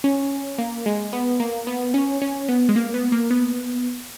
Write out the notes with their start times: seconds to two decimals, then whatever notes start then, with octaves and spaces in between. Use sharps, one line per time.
0.04 C#4
0.58 A#3
0.86 G#3
1.13 B3
1.40 A#3
1.67 B3
1.94 C#4
2.22 C#4
2.49 B3
2.69 G#3
2.76 A#3
2.94 B3
3.12 A#3
3.30 B3